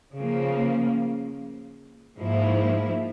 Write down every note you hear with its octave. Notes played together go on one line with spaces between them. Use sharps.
C#3 F3 A#3
G#2 F3 A#3 E4